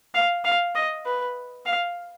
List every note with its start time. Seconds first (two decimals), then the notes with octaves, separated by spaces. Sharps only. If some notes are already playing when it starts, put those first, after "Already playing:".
0.15 F5
0.45 F5
0.75 D#5
1.06 B4
1.66 F5